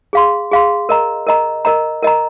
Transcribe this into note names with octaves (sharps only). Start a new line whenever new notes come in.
G#4 F5 C6
G#4 F5 C6
A#4 D#5 A#5
A#4 D#5 A#5
A#4 D#5 A#5
A#4 D#5 A#5